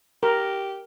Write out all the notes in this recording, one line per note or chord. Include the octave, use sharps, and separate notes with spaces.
G4 A#4